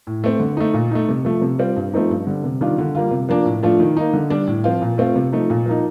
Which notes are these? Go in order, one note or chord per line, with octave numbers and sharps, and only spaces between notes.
A2
A3 C4
D3
A3 D#4
A#2
A3 D#4
C3
F3 A3
C3
G3 C4 F4
G2
F3 A3 C4 D#4
G2
D3 G3
C3
D#3 G3 D4 F4
D3
G3 A#3 F4
C3
F3 A#3 D4
A2
F3 A3 D4 F4
D#3
A#3 D#4
D3
G3 D4
A2
F3 C4 F4
A#2
A3 C4 F4
C3
F3 A3 D#4
A#2
F3 A#3 D#4